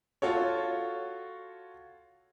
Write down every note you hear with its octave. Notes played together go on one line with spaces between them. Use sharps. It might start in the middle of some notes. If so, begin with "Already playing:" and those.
F4 F#4 A4 C#5